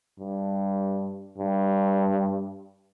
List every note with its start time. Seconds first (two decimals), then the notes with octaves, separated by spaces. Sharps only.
0.20 G2
1.38 G2